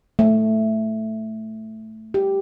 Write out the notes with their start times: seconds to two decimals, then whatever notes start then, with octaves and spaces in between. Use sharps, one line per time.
0.19 A3
2.14 G4